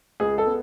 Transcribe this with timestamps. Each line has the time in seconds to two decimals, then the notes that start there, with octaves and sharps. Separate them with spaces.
0.20 C#2 G#4
0.38 A4
0.46 B3